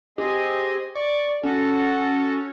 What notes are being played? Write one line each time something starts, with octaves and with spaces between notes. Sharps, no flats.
C4 G4 G#4 D#5
D5 C#6 D6
C#4 F#4 A4